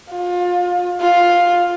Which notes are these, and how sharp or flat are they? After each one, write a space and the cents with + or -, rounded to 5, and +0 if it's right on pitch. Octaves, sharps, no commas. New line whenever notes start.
F4 +30
F4 +5